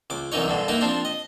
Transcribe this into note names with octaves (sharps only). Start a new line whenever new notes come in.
C#2 D6
C2 F#2 E3 D#4 C#5
G2 B2 D3
A#3 D#4 E4 A#5
F3 C4 D4
D#5